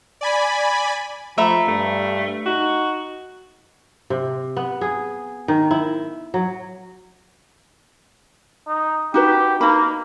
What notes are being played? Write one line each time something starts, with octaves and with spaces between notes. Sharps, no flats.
D5 G#5 B5
F3 A3 E5 A#5 B5
G2 A3
D#4 F#4
C3
B3
G#4
D#3
E4
F#3
D#4
D#4 F#4 G4 B4
A#3 D#4 B5